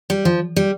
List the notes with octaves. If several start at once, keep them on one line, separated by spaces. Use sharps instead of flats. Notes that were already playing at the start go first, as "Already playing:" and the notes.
G3
F3
G3